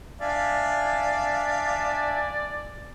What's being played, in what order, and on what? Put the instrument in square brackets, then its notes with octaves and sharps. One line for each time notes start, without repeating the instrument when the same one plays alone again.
[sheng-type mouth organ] D4 E5 G#5 [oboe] D5 [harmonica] F5